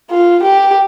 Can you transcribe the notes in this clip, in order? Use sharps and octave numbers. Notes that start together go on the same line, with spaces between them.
F4
G4